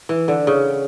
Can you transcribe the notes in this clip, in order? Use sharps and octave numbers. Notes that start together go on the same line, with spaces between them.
E3
D3
C#3